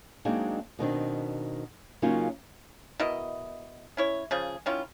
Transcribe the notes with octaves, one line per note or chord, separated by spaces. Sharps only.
F#3 G#3 A#3 C4 D4 D#4
B2 D#3 C4 D4
C#3 F#3 A#3 C#4 D#4 F4
B2 E4 A#4 D#5
C#4 E4 C#5
C#3 F3 G#4
D#3 C#4 E4 F4